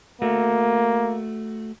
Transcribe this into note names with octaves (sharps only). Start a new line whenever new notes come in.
A3 A#3 F#4